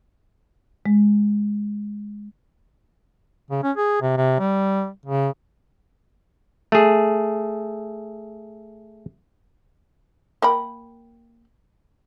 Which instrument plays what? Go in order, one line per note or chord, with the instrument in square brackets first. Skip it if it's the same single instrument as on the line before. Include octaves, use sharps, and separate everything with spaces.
[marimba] G#3
[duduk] C#3
C#4
G#4
C3
C3
G3
C#3
[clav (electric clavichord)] A3 G#4
[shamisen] A#3 G5 B5